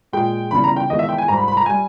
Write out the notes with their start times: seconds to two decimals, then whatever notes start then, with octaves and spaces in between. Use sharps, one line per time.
0.13 A#2 G#3 G5
0.51 E2 C#3 G3 B5
0.64 A#5
0.76 G5
0.90 E2 D#3 G#3 D#5
0.99 E5
1.09 G5
1.18 G#5
1.28 G#2 G3 A#5
1.37 B5
1.48 B5
1.57 A#5
1.66 G3 G#5